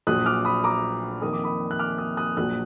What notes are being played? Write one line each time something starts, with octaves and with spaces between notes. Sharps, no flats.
A#1 A#2 F#3 D#6 F#6
D6 F6
B5 D#6
A#5 D6
F2 D#3 A#3 D#6
D6
B5 D#6
F#6
D6 F6
D#6 F#6
D#6 F#6
A#1 A#2 F#3 D#6 F#6